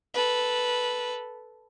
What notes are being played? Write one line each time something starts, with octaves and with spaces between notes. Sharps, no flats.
A4 B4